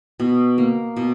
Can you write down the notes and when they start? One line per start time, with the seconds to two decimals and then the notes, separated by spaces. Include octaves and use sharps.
0.20 B2
0.58 A#3
0.97 B2